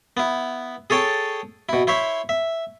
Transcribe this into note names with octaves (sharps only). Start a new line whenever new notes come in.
B3 E4
G#4 A4 C#5 G5 A5
B2 E4
E4 C5 C#5 E5
E5